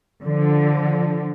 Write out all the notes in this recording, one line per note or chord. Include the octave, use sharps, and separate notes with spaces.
D3 F3